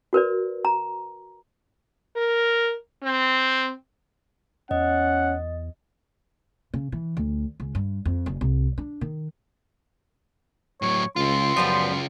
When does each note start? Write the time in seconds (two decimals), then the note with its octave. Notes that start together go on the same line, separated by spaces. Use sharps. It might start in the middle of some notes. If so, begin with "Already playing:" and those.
0.13 F#4 A#4 B4 D5
0.65 A#5
2.16 A#4
3.03 C4
4.71 E2 C#4 D#5 F#5
6.74 C#3
6.92 E3
7.17 D2
7.60 C#2
7.75 G2
8.05 F2
8.26 F#1
8.41 C2
8.78 D4
9.01 D#3
10.82 A2 F#3 C#5
11.16 C#2 C#3 F4 C6
11.56 F#2 F3 G3 B3